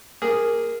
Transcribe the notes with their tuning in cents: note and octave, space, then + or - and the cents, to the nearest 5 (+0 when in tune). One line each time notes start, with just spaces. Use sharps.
A#3 +0 G#4 -10